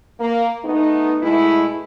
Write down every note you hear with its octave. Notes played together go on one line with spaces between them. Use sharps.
A#3
A3 B3 D#4
B2 G#3 A3 E4